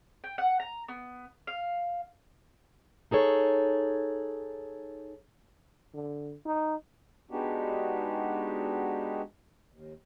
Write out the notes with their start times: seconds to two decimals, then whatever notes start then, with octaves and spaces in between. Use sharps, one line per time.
0.24 G5
0.38 F#5
0.60 A#5
0.88 B3
1.47 F5
3.11 D#4 G#4 A4 C#5
5.94 D3
6.46 D#4
7.31 G#3 B3 D4 D#4 F#4 G4
9.72 D#2